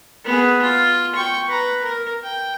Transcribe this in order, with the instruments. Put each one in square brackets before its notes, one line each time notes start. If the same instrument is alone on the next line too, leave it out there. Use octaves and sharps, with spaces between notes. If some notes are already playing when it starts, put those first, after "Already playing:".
[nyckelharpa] B3 G#4
F4
G5 C#6
B4 A#5
A#4
G5